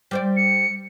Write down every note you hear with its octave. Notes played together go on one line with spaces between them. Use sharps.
G3 C5 D5
C#7